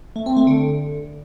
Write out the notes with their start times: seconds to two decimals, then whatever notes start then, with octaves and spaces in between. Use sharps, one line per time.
0.16 A3
0.26 C4
0.37 A3
0.47 D3